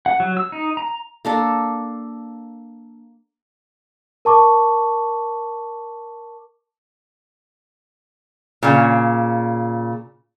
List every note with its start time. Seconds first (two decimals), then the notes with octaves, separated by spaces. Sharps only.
0.06 F#5
0.20 F#3
0.37 E6
0.52 D#4
0.77 A#5
1.25 A#3 D4 A4
4.25 A#4 A5 C#6 D6
8.63 A#2 C#3